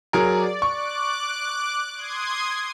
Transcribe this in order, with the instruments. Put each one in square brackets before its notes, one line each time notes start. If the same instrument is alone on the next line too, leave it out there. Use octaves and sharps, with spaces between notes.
[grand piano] F#3 G#4 A#4 [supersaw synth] D5
[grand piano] C#6 [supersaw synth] D6 F#6
[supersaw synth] C6 D#6 G#6